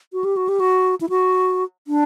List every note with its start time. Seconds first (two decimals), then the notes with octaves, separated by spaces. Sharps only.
0.13 F#4
0.24 G4
0.36 F#4
0.48 G4
0.60 F#4
1.01 E4
1.09 F#4
1.87 D4